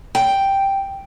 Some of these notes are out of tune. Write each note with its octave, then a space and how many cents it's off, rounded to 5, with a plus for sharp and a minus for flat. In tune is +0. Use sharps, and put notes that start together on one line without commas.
G5 +0